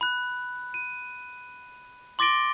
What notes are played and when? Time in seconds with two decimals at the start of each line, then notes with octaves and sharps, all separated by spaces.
0.01 B5 F#6
0.74 D#7
2.19 C6 D6 A6 A#6 D7 G7